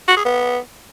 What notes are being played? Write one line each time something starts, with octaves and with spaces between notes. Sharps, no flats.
F#4
G#4
B3